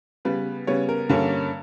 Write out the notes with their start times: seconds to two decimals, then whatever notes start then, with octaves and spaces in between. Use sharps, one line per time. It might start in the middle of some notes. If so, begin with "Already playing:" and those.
0.25 C#3 G3 B3 B4
0.67 C#3 G3 B3 C#5
0.89 A#4
1.09 G2 D3 A#3 C#4